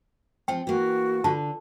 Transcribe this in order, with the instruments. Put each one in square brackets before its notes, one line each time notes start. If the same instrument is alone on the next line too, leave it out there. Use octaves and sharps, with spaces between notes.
[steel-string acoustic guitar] F3 C4 [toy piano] G5
[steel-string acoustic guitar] E3 A#3 [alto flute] F#4
[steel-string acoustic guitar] D3 [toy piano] F4 A5